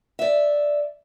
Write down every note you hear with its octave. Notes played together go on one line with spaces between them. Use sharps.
D5 E5